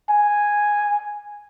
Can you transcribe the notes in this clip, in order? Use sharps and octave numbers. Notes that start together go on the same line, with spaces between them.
G#5